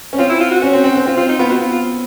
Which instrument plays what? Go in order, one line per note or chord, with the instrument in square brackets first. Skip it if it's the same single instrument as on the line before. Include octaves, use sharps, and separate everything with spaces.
[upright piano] C#4
[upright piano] C4 [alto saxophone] F4
[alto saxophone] E4
F4
F#4
[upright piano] C#4
C4
C4
C4
[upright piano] C4 [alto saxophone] F4
[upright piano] C4 [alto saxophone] F4
[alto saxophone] D#4
[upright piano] B3 [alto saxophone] F4
[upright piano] B3 [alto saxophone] F#4
[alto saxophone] F4
F4